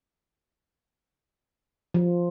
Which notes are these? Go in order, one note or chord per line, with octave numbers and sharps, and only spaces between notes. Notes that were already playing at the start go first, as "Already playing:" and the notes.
F3